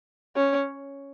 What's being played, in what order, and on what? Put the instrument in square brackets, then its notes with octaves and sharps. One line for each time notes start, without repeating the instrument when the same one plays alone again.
[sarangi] C#4